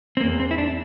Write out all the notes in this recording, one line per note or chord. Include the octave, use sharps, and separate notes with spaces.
C4
E2 A#3
C4
E4
D4